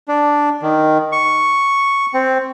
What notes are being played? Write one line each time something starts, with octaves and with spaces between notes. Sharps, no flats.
D4
D#3
C#6
C4